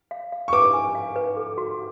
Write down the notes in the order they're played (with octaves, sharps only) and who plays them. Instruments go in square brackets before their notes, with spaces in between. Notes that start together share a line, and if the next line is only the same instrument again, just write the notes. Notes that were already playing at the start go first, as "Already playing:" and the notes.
[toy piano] F5
F5
[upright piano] C#6
[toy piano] B4 [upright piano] D6
[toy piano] G#5
F5
B4
A4
F#4